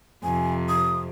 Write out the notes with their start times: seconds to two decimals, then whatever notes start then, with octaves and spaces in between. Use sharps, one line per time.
0.23 F2 C3 G#5
0.69 D#6